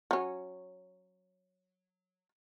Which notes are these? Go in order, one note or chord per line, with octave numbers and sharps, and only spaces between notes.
F#3 C#4